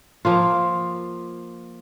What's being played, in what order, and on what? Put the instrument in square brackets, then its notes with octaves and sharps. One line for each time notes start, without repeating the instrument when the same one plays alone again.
[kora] F3 A#3 F4